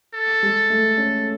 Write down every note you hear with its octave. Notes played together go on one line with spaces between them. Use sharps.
A4
G#3
A3
C#4